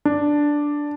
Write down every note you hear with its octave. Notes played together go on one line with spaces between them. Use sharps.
D4